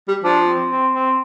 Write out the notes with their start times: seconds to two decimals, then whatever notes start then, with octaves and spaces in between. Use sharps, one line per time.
0.09 G3
0.24 F3 D4
0.48 C4
0.71 C4
0.94 C4